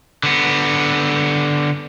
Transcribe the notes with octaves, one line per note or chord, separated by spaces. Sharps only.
D3 B3